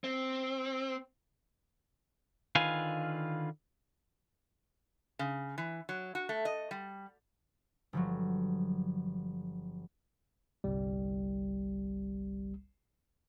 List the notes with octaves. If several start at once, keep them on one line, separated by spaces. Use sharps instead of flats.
C4
D3 D#3 F4 B4 F5 G#5
C#3
E3
F#3
F#4
A3
D#5
G3
G1 F3 F#3
G1 C2 G3